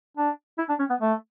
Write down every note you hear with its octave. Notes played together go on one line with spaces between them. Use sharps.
D4
E4
D4
C#4
B3
A3